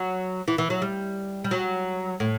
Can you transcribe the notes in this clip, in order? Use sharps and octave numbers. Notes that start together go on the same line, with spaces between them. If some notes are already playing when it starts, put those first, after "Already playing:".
Already playing: F#3
E3
E3
F#3
G3
G3
F#3
A2